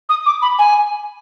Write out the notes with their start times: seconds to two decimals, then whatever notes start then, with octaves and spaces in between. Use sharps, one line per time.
0.09 D#6
0.26 D6
0.42 B5
0.59 G#5